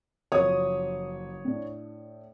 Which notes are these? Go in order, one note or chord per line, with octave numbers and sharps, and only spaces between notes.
F#1 F3 C#5 D#6
A2 D4